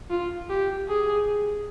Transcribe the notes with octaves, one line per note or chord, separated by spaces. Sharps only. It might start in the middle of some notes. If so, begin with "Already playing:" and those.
F4
G4
G#4